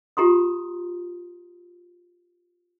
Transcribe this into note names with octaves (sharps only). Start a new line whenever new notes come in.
F4 G4 A#5 C6 D#6